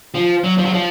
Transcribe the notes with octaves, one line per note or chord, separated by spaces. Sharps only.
F3
F#3
F3
F#3
F3